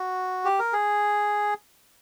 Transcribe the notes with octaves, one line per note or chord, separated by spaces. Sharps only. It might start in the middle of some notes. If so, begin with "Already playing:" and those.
Already playing: F#4
G4
A#4
G#4